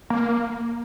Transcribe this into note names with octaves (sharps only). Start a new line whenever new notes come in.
A#3